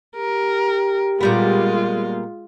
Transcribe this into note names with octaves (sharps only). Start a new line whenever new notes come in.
G4 A#4
A#2 G3 G#3 B3 F4